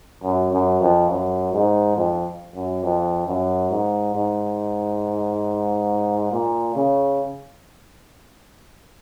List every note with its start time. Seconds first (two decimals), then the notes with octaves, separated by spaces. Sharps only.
0.23 F#2
0.51 F#2
0.81 F2
1.09 F#2
1.53 G#2
1.97 F2
2.55 F#2
2.83 F2
3.27 F#2
3.70 G#2
4.14 G#2
6.32 A#2
6.75 C#3